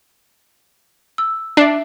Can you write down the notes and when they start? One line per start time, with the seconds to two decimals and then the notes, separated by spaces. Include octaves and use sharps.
1.18 E6
1.57 D4 E5 C7